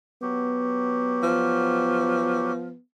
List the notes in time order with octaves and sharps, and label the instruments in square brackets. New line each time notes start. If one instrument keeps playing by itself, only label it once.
[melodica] F#3 G4 [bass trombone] B3
[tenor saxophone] F3